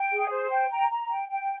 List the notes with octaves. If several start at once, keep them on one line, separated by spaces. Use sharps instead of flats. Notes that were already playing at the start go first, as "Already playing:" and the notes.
Already playing: G5
G#4
C5
G5
A#5
A#5
G5
G5